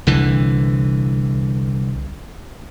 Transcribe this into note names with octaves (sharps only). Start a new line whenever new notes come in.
C2 D3 E3